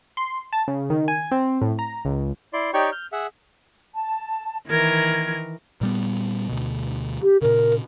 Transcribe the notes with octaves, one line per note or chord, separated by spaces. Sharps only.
C6
A5
C#3
D#3
G#5
C4
A2
A#5
C#2
E4 D5 C6
D#4 G4 C#5 D5 G5 C#6
F6 G6
G#4 E5 F#5
A5
D#3 E3 A#4 G#6
A#2 G3 B3
D2 B2
G4
A#2 C#3 A#4